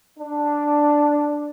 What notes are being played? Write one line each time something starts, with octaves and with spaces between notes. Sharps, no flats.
D4